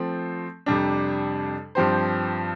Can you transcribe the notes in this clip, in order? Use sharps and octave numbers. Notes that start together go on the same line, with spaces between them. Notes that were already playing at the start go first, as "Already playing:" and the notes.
Already playing: F3 A3 C4
F2 C3 G3 D4
G2 F3 C4 G4 C5